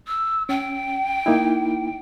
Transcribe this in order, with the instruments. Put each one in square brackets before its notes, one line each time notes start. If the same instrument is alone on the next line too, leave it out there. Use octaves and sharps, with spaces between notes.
[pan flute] E6
[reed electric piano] C#4 [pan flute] G5
[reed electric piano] A#3 D#4 E4